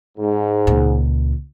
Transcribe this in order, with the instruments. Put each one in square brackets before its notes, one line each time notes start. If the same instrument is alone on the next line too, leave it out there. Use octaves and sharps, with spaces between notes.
[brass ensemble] G#2
[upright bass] C#2 A#2